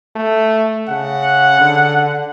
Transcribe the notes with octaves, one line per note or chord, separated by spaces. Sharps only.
A3
C#3 F#5
D3